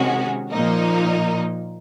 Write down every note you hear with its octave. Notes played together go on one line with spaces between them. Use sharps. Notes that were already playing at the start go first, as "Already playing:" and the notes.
Already playing: C3 D#3 G#3 C#4 F#4
A#2 F3 A#3 D#4